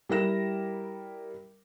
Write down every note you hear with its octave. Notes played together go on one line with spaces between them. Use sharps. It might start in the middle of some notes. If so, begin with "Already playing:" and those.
G3 E4 A#4 A#6 E7